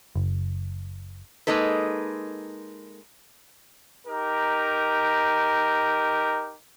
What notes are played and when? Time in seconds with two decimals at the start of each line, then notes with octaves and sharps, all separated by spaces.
0.16 F#1
1.47 G#3 A#3 D#4 A4 B4
4.07 D#4 G4 A#4